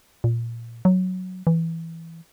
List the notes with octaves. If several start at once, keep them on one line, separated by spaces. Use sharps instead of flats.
A#2
F#3
E3